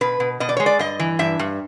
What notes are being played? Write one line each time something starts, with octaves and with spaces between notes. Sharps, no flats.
B2 B4
B2
B2 D#5
D5
G#3 C#5
D5
G2 D#5
E3
G2 E5
G2